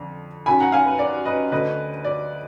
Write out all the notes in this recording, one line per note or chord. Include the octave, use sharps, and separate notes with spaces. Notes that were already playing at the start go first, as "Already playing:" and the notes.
Already playing: F2 D3
F#2 D#3 G#5 B5
F#5 A#5
F5 G#5
B4
D5
B4 D#5
D2 D3 B4 D#5
D5